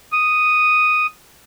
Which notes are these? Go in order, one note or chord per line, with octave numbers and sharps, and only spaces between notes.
D#6